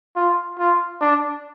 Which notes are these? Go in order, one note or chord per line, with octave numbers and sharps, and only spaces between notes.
F4
F4
D4